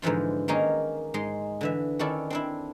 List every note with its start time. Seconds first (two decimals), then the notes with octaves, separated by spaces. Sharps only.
0.02 G#2 D3 E3 F3 F4
0.48 D#3 A#3 C#4 D#4 G#4 A#4
1.14 G#2 G#3 D#5 A#5 C6
1.61 D3 E3 E5
1.99 D#3 C#4 D4 E4 A4 D5
2.30 C4 D4 E4